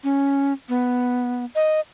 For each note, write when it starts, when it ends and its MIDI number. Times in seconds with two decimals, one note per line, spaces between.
0.04 0.53 61
0.69 1.45 59
1.56 1.80 75